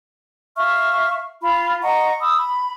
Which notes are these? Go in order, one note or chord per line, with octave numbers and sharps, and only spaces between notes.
E5 F5 C#6 F6
F4 B5
D#5 F#5 A#5 C#6
B5 D#6 E6
B5